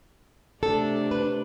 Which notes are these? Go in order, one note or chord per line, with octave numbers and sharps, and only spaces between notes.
C3 A3 D4 A4
B4